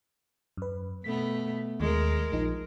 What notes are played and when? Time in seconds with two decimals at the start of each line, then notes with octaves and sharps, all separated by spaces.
0.57 F#2 B4
1.04 B2 A3 B3 B6
1.80 D#2 G#3 A#4
2.32 A#1 F3 D#4